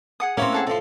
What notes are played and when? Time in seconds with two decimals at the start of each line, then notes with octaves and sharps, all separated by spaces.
0.20 G#4 F#5 D#6
0.37 A#3 C4 C#4 E4 C#5
0.52 G#4 A4 F#5
0.67 A2 F3 A4 C6